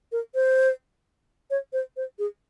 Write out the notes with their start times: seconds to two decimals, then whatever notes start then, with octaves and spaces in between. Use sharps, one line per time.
0.12 A#4
0.35 C5
1.50 C#5
1.73 C5
1.97 C5
2.19 G#4